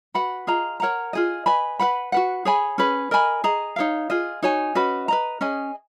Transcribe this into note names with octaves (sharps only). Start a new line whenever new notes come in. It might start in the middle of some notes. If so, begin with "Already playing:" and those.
F#4 B4 F#5 B5
F4 G#4 D#5 A#5
A#4 C#5 F#5 A#5
F4 G#4 D#5
B4 D#5 G#5 B5
B4 F#5 B5
F#4 B4 F#5
G#4 C#5 G#5 B5
C#4 G#4 B4
A#4 D#5 G#5 B5
G#4 D#5 A#5
D#4 A#4 C#5 F5
F4 G#4 D#5
D#4 F#4 C#5 G#5
C#4 F#4 B4 D#5
B4 D#5 A#5
C#4 G#4 D#5 G#5